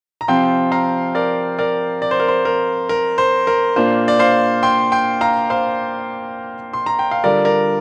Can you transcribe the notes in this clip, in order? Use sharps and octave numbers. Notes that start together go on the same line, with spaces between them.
A#5
C3 F3 C4 F4 G5 C6
F5 A#5
A#4 D5
A#4 D5
D5
C5
A#4
C5
A#4
A#4
C5
A#4
A#2 A#3 D4 F4 C5
D5
C5 F5
G5 C6
G5 C6
F5 A#5
C5 F5
C6
A#5
G5
F5
D3 G3 D4 F4 A#4 D5
A#4 D5